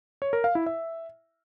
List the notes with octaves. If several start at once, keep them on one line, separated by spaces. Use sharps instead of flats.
C#5
A#4
F5
E4
E5